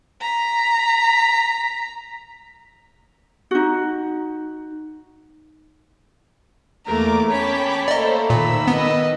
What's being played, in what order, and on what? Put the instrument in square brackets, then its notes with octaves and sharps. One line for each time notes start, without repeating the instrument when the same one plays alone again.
[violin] A#5 B6
[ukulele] D#4 F#4
[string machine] E2 D6 [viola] A3 A#3 [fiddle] A#4
[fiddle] C#4 [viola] C#5 B5 [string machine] G5 A5 D6
[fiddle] A3 A#3 [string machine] A4 C5 [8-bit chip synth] D5 D#5
[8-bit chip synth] A#2 [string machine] D#3 E6 [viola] B5
[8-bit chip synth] B3 [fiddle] B4 D#5